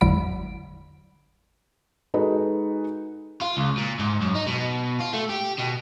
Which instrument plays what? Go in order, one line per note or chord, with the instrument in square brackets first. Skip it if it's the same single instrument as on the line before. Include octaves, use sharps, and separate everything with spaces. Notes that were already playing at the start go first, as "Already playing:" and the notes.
[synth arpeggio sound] G#1 E2 D3 F#3 B5 D7
[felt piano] G#3 D#4 F#4 A4 B4 D#5
[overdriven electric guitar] F4
C#2
A#2
G#2
F#2
D#4
B2
F4
A3
G4
B2